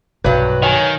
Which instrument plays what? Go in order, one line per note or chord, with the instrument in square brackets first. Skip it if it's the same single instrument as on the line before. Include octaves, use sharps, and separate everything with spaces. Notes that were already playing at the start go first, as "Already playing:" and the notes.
[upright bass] B1 [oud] G2 F#3 [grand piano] B4
[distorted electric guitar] D#3 [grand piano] C#5 G#5